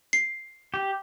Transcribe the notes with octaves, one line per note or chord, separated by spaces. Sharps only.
C7
G4